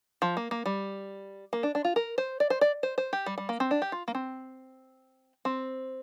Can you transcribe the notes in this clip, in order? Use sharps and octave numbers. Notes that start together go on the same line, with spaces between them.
F3
A#3
A#3
G3
A#3
D4
D4
F4
A#4
C5
D5
C5
D5
C5
C5
G4
G3
G3
A#3
C4
D4
G4
F4
A#3
C4
C4